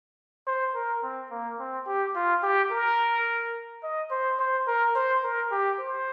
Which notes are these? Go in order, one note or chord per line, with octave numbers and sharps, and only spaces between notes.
C5
A#4
C4
A#3
C4
G4
F4
G4
A#4
D#5
C5
C5
A#4
C5
A#4
G4
C5